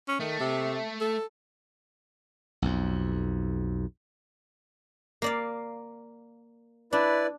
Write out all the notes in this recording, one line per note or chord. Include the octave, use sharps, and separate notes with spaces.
C#4
D#3 A3
C3
A4
B1 F2
A#3 D5 F5
D4 E4 B4 D5